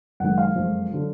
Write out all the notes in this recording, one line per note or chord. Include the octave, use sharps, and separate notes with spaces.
F#1 F#2 D#3 G#3 F#5
F5
F#1 F2 F3 G#3
D3 F#3